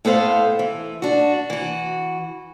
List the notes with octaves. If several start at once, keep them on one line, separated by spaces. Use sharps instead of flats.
A2 B3 A4 C5 F5
E3
D4 F#4
E3 F#4